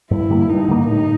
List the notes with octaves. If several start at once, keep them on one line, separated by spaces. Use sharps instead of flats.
G2 E4
D3 G3 A#3
G2 D#4
D3 G3 A#3
A2 D#4